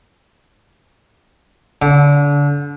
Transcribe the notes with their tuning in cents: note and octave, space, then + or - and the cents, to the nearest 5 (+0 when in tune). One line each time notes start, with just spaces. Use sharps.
D3 -30